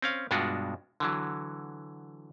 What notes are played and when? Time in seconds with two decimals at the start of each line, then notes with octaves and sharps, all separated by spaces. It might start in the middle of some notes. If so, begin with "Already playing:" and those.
0.02 C4 C#4 F5
0.31 G2 B2 G#3 D4 F4 F#4
1.00 D3 E3 F#3